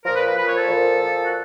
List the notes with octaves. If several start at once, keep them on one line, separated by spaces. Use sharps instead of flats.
A#2 F3 A#4
B4
B4
A#2 F3 B4
C#5
A4
A#2 F3
A#2 F3
F#4